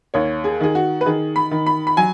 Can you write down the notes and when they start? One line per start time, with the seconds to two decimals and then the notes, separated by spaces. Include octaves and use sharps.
0.14 D#2 C#5
0.44 G#4
0.60 D#3 G#4
0.75 F#4
1.01 B4
1.06 D#3 G#4
1.36 B5
1.51 D#3
1.66 B5
1.87 B5
1.97 F#3 G#5